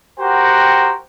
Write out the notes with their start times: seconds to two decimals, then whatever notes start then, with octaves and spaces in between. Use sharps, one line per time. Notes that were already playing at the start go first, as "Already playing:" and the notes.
0.20 F#4 G4 A#4 C5 F#5 G5